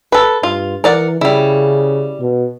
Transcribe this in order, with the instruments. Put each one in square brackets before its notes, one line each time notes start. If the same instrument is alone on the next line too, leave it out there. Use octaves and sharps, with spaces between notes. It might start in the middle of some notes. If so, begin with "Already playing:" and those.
[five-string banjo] A4 B4
[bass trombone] G2 [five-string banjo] F4
[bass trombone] E3 [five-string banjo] A#4 D5 F#5
[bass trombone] C#3 [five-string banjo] G3 E4
[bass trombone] B2